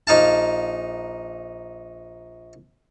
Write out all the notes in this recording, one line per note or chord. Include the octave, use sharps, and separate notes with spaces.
A#1 D#4 F5 A5